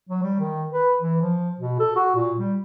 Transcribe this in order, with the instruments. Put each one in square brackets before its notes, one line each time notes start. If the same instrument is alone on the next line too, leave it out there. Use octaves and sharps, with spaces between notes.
[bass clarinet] F#3
G3
D#3
B4
E3
F3
B2
A4
F#4
A#2
G3